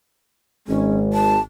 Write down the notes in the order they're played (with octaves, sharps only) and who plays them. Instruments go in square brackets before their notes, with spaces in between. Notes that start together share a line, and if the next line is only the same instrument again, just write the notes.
[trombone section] G#1 G#3 [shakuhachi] C#4
[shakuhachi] A5